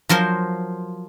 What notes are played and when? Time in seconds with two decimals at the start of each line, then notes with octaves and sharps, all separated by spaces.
0.09 F3 F#3 A#4 C5